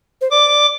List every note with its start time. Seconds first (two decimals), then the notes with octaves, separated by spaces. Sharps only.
0.21 C5
0.31 D5 D6